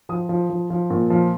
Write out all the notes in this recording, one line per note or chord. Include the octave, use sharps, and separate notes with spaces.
F3 D#6
F3
F3
F3
A#2
F3